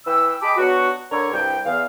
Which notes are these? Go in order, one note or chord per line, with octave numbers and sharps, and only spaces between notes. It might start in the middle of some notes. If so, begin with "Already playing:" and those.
E3 B4 G5 E6
G4 G#4 D#5 A5 B5 D6
F#3 B3 D4 F#4
D3 A#4 C#5
C2 G2 G5
E2 F5